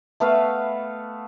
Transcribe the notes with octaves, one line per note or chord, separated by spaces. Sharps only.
A3 B3 B4 F5